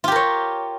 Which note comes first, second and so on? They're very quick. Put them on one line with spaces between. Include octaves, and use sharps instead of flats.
F4 G4 A#4 C#5